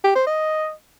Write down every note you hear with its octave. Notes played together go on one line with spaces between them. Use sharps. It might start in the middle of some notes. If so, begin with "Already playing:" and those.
G4
C5
D#5